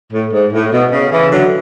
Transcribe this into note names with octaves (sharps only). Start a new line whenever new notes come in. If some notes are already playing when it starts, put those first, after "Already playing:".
A2
G#2
A2
B2
C#3
C#3 E3
D3 F#3